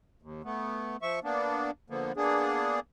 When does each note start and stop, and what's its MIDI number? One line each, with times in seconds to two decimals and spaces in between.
0.22 0.42 39
0.44 0.97 57
0.44 0.97 59
1.02 1.19 53
1.02 1.19 76
1.02 1.19 85
1.24 1.71 58
1.24 1.71 59
1.24 1.71 62
1.90 2.12 50
1.90 2.12 53
1.90 2.12 58
1.90 2.12 59
2.17 2.80 58
2.17 2.80 59
2.17 2.80 62
2.17 2.80 68